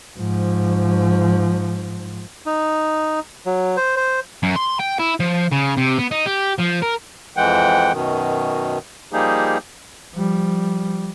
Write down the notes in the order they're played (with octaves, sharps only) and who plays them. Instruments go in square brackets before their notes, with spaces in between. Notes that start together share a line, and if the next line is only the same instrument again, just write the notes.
[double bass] G#2 F3
[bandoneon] D#4
F#3
C5
C5
[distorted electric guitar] F#2
C6
G5
E4
F3
C#3
C3
B3
D#4
G4
F3
A#4
[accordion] F2 E3 G#3 F#5 G5
F#2 B2 D#3
F3 G3 A#3 D#4 G4 G#4
[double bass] F3 G3